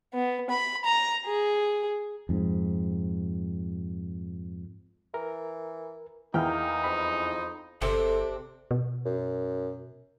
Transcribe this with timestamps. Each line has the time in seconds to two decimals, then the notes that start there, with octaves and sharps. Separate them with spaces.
0.13 B3
0.50 B5
0.85 A#5
1.26 G#4
2.29 F2 G#2
5.14 E3 A#4
6.34 E2 A#3 D#4 E4 G5 F6
6.84 F2 B5
7.82 G1 C3 C4 D4 A4
8.71 B2
9.06 F#2